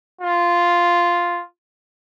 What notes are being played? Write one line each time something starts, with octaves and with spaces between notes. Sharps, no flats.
F4